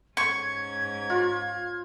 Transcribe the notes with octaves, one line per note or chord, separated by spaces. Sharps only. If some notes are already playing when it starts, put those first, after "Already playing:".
G#2 C#4 C#6 G#6
F4